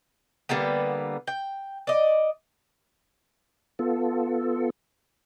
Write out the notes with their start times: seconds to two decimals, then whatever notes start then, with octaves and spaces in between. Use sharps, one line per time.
0.49 D3 G3 A#3 B3
1.27 G5
1.87 D5 D#5
3.79 B3 F4 A4